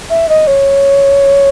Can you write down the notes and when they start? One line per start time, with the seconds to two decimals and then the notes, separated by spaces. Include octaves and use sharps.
0.10 E5
0.28 D#5
0.47 C#5